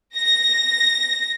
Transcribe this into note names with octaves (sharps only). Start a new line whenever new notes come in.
A#6